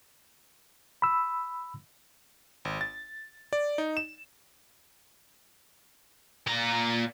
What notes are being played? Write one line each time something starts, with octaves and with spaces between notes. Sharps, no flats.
B5 E6
G#1
A6
D5
D#4
E7
A#2 A#5